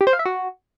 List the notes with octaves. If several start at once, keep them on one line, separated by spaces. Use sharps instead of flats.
G4
C5
F5
E5
F#4